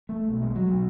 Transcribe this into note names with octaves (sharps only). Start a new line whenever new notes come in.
A3
B1 B2
G#3
F#3
B2